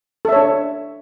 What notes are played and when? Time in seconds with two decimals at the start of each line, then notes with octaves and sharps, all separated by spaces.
0.25 A4
0.29 E5
0.32 C#5
0.36 D4